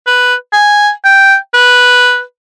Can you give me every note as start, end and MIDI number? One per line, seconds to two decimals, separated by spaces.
0.07 0.34 71
0.53 0.90 80
1.05 1.36 79
1.54 2.21 71